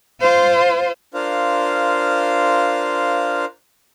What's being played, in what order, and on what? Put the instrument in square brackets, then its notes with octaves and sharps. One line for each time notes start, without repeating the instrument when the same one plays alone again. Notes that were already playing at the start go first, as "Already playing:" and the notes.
[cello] F4 C5
[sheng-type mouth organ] D4 F4 A#4 C5 F5